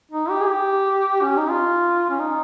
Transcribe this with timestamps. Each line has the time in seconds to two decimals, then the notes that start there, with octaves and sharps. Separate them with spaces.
0.11 D#4
0.30 G4
0.41 G#4
0.47 G4
1.23 C#4
1.37 D#4
1.50 F4
2.10 C#4
2.19 D#4